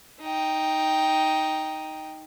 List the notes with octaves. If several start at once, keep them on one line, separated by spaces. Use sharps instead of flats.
D#4 G5